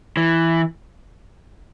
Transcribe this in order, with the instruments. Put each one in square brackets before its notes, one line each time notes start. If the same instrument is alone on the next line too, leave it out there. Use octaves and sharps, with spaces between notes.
[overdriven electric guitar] E3